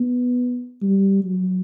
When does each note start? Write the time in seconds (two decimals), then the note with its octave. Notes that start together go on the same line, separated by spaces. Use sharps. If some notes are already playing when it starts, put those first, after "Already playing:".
Already playing: B3
0.82 G3
1.25 F#3